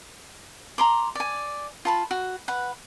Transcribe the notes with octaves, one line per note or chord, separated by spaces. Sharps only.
A#5 C6 D6
D5 G#5
F4 A5 B5
F#4
B4 F#5